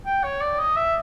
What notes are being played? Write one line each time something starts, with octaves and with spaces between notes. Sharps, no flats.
G5
C#5
D5
D#5
E5